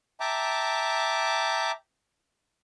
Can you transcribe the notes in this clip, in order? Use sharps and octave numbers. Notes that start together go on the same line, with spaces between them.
E5 G5 A5 A#5 D6